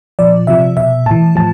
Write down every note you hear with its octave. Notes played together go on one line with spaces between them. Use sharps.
A#2 F3 D5
C3 F3 E5
B2 E5
A2 E3 A5
A2 F3 A5